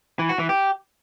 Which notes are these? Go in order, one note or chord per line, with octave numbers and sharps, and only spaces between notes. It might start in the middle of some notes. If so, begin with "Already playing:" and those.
E3
F#4
E3
G4